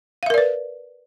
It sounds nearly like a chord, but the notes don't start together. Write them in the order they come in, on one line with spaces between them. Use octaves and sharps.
F5 E5 A#4 D5 B4